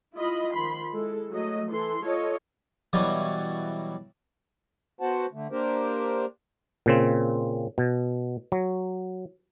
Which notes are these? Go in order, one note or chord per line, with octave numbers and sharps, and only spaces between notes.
E4 F4 D#5 B5
D#3 F3 B5 C6
G#3 E4 A4
F#3 A3 D#5
E3 A4 C6
F4 A4 C#5 D#5
B2 E3 F#3 G3
B3 F#4 C5 F#5 A5
D3 A3
A#3 D4 G4 A#4 C5
A#2 C#3 C4
B2
F#3